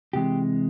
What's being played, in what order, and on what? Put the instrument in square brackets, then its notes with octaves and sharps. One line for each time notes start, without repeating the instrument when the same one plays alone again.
[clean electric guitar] C3 E3 G#3 G4